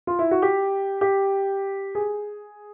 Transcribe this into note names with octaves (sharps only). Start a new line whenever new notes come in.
F4
E4
F#4
G4
G4
G#4